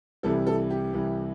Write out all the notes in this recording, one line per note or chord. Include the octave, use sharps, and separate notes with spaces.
C2 C3 E3 G3 A4
A4
G4
C2 C3 E3 G3